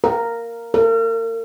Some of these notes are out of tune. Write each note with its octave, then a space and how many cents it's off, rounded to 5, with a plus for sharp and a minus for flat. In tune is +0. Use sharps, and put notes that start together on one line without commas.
A#4 -5
A#4 -40